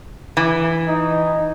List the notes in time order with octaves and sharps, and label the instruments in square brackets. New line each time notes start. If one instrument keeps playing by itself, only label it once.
[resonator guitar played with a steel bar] E3
[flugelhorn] D#4